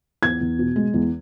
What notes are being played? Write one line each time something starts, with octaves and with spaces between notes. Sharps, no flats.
E2 G#6
E2
B2
G#3
E2